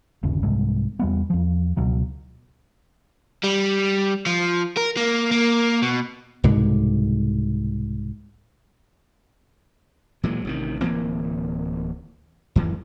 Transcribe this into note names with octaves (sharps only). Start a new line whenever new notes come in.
G1 D#2 C#3
C2 G#2
E2 G3 B3
E2 F3
C#2 B2 F#3
G3
F3
A#4
A#3
A#3
B2
C2 G#2 B2 D3
A#2 E3 F#3 G#3
A1 C3 D#3
D1 E3 A#3 C4
F#2 E3